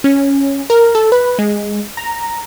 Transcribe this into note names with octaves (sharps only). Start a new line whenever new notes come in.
C#4
A#4
A4
B4
G#3
A#5